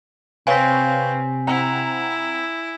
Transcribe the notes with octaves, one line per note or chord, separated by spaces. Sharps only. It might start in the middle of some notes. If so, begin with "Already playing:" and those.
C3 C4 B4 C#5 F5 G#5 B6
C4 E4 F#5 A#5